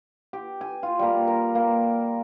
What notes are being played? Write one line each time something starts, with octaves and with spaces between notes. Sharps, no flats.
G4
G#5
F4
G3 A#3
A#4
A#3